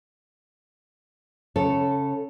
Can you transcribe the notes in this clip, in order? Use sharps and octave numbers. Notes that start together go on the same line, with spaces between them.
C#3 A4 C#5